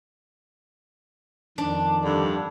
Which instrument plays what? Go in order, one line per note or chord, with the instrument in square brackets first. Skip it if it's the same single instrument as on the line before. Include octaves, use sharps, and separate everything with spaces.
[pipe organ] F2 D#3 [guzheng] D4
[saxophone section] G2 D3